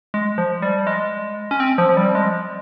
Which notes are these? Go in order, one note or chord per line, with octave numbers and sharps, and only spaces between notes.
G#3
F3
G3
G#3
C#4
C4
F3
F3
G3
G#3